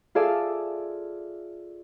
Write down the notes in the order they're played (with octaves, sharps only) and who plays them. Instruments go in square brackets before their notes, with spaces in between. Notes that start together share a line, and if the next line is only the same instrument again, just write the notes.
[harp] F4 G#4 A4 D5 E5 F5